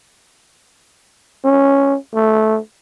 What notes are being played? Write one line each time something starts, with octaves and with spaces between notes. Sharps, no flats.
C#4
A3